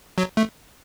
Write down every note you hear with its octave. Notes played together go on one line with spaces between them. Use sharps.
F#3
A3